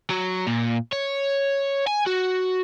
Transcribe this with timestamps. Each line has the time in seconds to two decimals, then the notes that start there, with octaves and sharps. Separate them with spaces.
0.10 F#3
0.47 A#2
0.93 C#5
1.87 G#5
2.07 F#4